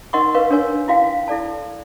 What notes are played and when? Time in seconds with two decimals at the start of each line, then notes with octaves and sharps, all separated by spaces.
0.13 D#4 A#4 D#5 F#5 C6 C#6
0.35 A#4 B4 F5 C#6
0.51 D4 A#4 C#5 G#5
0.88 E4 F#4 F5 G5
1.28 E4 A4 D5 A5